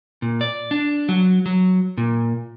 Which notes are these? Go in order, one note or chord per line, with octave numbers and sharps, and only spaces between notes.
A#2
D5
D4
F#3
F#3
A#2